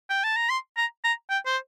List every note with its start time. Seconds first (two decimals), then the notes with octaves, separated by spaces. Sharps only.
0.10 G5
0.24 A5
0.36 A#5
0.50 C6
0.77 A#5
1.04 A#5
1.30 G5
1.46 C5